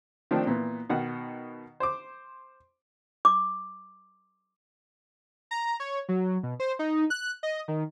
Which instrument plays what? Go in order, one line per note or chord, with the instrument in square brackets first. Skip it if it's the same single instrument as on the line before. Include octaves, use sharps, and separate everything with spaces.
[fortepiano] D#3 F3 A3 C4 D4
A#2 E3 B3
B2 D#3 F#5
C5 D6
[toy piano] D6
[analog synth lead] A#5
C#5
F#3
B2
C5
D#4
F#6
D#5
D#3